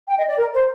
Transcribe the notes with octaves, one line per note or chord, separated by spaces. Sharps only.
G5
D#5
D5
A#4
C5